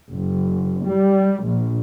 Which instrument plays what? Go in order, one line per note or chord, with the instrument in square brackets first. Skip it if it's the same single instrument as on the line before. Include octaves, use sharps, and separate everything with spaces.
[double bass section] F#1
G3
A#1